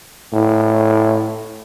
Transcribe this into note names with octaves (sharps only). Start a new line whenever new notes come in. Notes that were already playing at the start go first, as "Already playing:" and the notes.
A2